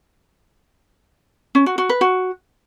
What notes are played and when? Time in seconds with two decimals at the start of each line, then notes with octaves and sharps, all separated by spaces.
1.55 C#4
1.66 F#4
1.78 F#4
1.89 B4
2.01 F#4